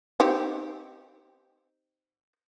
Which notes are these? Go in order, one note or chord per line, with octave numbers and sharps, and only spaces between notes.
C4 D#4 G4